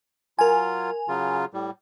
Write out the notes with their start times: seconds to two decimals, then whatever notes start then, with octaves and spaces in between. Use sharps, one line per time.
0.39 F#3 F4 A#4 G#5
1.08 C#3 F#3 F4
1.54 A2 G3